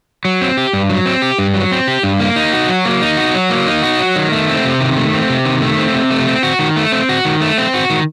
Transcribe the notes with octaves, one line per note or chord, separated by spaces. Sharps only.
F#3
C4
G4
G2
F#3
C4
G4
G2
F#3
C4
G4
G2
A#3
D#4
F#4
F#3
A#3
D#4
F#4
F#3
A#3
D#4
F#4
F#3
D#3
A3
C4
C3
D#3
A3
C4
C3
D#3
A3
C4
C3
A3
C4
F#4
D#3
A3
C4
F#4
D#3
A3
C4
F#4
D#3